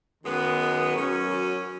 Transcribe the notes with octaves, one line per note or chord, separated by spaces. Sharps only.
F#2 D#3 G#3 B3
F#2 F#3 C#4